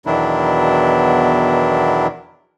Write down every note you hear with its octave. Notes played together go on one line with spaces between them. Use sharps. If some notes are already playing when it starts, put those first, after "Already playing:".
E2 B2 D#3 F#3 D4 E4